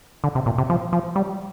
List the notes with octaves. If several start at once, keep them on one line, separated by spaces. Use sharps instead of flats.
D3
C3
A#2
C3
F3
F3
G3